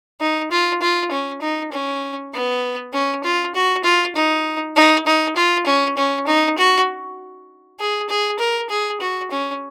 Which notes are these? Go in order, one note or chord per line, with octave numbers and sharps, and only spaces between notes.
D#4
F4
F4
C#4
D#4
C#4
B3
C#4
F4
F#4
F4
D#4
D#4
D#4
F4
C#4
C#4
D#4
F#4
G#4
G#4
A#4
G#4
F#4
C#4